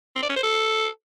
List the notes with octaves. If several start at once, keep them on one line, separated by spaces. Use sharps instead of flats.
C4
D5
C#4
C5
A4